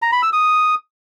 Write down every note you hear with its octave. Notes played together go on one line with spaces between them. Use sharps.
A#5
B5
E6
D#6